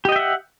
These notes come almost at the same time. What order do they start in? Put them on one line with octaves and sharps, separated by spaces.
G4 D#5 G5 E5 F#5